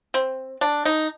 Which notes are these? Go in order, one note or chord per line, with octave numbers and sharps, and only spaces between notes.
C4
D4
D#4